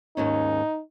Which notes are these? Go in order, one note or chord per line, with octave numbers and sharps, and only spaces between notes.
D#2 G#2 C#4 D#4